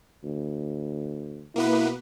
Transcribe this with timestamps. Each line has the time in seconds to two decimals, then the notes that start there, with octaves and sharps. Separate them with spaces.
0.24 D2
1.56 B2 A#3 B3 E4 B4